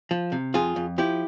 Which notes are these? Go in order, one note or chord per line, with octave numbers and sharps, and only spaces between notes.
F3
C3
F2 F4 G#4
F2
F3 E4 G4